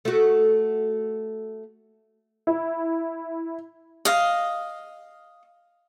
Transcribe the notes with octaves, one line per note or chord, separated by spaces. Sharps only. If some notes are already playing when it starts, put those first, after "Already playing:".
A3 F#4
E4
D#5 F5